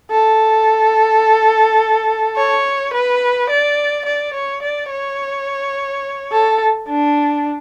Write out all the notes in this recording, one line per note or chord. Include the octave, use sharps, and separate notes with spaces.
A4
C#5
B4
D5
D5
C#5
D5
C#5
A4
D4